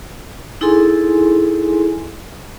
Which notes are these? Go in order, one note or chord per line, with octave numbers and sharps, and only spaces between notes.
D#4 E4 G#4 A4 G#5 C6